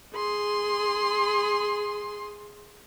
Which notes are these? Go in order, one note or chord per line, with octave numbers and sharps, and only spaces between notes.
G#4 C6